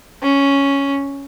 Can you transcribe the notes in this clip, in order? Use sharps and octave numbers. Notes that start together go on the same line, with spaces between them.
C#4